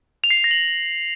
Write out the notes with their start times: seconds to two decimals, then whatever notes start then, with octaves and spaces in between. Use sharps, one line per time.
0.24 F7
0.30 C7
0.37 F7
0.44 A#6
0.51 F#7